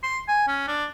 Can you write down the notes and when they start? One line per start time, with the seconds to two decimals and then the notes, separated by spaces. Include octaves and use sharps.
0.03 C6
0.28 G#5
0.48 C#4
0.68 D4